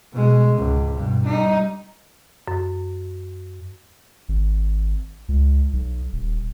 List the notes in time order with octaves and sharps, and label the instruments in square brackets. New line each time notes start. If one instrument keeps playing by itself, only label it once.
[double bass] B2 G#3
C#2 G#2
G2 B2
G3 D#4
[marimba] F#2
[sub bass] G#1
C#2
B1
D#1